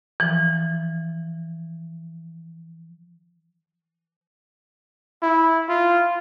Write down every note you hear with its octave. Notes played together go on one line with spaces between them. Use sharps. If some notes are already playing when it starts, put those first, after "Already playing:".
E3 F3
E4
F4